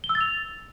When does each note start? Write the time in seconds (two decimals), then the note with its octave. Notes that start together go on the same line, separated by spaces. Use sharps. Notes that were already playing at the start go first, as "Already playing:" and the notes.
0.04 G7
0.09 E6
0.15 A6
0.21 F7